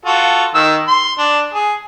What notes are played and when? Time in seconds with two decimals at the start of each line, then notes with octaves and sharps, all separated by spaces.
0.05 F4 F#4 A4
0.55 D#3 E6
0.88 C6
1.19 D4
1.54 G#4